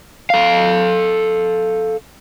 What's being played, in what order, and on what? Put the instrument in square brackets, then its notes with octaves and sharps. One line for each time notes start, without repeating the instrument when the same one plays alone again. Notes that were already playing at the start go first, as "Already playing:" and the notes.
[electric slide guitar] A4 F5